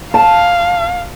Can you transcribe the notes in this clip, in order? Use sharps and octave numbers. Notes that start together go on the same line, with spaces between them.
F5 A5